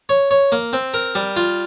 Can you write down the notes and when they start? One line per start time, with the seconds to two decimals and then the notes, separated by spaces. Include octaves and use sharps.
0.09 C#5
0.31 C#5
0.52 A#3
0.73 C4
0.94 A#4
1.15 G3
1.36 F4